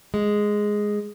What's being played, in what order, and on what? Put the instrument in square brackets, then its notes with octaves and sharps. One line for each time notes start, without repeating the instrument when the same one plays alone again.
[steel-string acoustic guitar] G#3